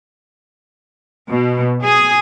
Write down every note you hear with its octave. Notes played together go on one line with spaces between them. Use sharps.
B2
G#4